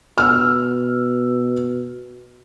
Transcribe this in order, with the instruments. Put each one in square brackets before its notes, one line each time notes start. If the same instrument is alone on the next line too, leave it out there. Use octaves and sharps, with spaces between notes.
[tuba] B2 [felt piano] E6 F6